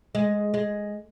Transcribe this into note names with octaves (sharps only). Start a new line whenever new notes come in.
G#3
G#3